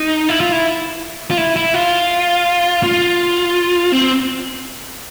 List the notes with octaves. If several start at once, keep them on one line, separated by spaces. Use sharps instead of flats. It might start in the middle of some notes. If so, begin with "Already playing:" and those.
Already playing: D#4
E4
F4
E4
F4
E4
E4
F4
F4
C4